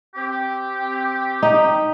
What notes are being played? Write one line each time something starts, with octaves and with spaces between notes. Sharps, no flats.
C4 G4
D#4